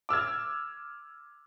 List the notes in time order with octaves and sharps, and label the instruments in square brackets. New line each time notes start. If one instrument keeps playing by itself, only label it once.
[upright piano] D6 E6 F6 G#6